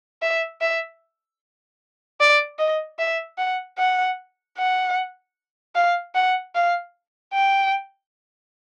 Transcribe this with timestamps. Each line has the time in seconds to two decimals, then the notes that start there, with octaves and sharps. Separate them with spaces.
0.22 E5
0.61 E5
2.20 D5
2.59 D#5
2.99 E5
3.38 F#5
3.79 F#5
4.58 F#5
5.75 F5
6.15 F#5
6.55 F5
7.34 G5